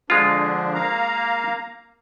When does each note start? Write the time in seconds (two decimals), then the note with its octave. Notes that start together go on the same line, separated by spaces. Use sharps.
0.10 D3 F3 G#3 D4 F4
0.74 A#3 F5 A#5